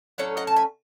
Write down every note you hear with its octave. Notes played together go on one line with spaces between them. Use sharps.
A2 F#3 C#4 C#5 E5
D#5 F#5
A5
E5 G#5